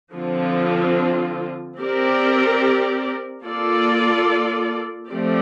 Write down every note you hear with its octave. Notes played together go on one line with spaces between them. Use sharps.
D3 F3 C4 F4
C4 G4 A#4 D5
A#3 F4 A4 D5
F3 A3 C4 G4 D5